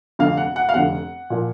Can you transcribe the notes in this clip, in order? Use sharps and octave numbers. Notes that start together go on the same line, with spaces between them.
F1 F2 D3 F5
F#5
F#5
F5
F1 F2 D3 F#5
A#2 F3